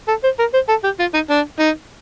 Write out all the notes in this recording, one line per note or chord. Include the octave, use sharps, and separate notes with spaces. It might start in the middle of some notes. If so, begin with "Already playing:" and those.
A4
C5
A#4
C5
A4
G4
F4
D#4
D4
D#4